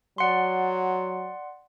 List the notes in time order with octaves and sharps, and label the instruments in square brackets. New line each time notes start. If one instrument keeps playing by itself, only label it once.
[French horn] F#3 [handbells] D5 F#5 C6